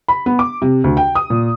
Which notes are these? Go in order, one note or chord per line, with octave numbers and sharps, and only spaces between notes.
B5
B3
D6
C3
D2
G5
D#6
A#2